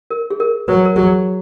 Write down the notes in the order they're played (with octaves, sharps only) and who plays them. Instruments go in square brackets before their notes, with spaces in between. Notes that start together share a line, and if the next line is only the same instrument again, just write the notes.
[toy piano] A#4
G#4
A#4
[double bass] F#3 [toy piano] B4
[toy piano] A#4
[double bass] F#3 [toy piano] G#4